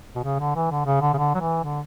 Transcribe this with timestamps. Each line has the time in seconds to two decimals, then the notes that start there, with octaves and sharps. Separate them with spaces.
0.15 B2
0.24 C#3
0.39 D3
0.56 E3
0.71 D3
0.86 C#3
1.02 D3
1.14 C#3
1.18 D3
1.35 F#3
1.41 E3
1.64 D3